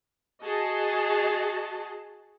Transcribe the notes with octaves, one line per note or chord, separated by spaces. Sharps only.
F#4 G#4 D#5 A5